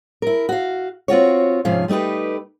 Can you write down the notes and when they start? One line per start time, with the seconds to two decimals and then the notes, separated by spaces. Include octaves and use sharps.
0.22 E4 A#4
0.49 F#4 F5
1.08 C4 F4 F#4 C#5
1.65 G#2 C3 F3 C#4 F5
1.88 G3 A3 D#4 G4 B4